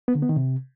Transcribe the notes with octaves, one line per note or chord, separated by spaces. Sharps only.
B3
D3
B3
D#3
C3